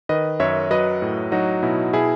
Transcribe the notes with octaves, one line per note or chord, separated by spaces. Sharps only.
D#3 B4 D#5
F#2 C#5 E5
F#3 B4 D#5
A2
F#3 D#4 F#4
B2 E4
B2 E4 G#4